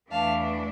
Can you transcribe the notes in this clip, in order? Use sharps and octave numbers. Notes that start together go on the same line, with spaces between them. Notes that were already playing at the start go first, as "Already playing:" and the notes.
E2 E3 A3 D4 F5 A5